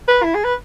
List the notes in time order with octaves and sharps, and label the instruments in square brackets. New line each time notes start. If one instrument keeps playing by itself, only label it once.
[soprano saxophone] B4
E4
G#4
B4